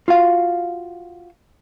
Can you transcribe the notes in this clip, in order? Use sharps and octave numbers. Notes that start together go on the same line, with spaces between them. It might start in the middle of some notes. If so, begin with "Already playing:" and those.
F4 F#4 F5